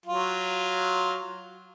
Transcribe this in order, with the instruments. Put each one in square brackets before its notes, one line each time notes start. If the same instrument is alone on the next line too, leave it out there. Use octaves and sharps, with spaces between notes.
[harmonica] F#3 F4